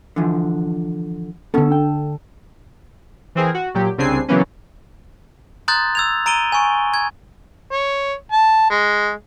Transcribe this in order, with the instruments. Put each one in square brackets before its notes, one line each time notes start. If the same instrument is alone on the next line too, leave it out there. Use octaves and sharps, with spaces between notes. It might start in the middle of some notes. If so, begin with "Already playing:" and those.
[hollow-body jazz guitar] D3 E3 F3
[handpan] D3 A4 [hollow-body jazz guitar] B3 C#4
[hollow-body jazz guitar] G5
[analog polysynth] E3 C4 G#4 A#4
F#4
A#2 F#3 G4
C2 C#3 C4 D4 G#5 C7
C#3 E3 F#3 A#3 B3 C#4
[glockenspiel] A#5 C6 D#6 F#6 G6 A6
E6 G#6 F7
A#5 D7 D#7 G7
G#5 C#6
G#6
[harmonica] C#5
A5
G#3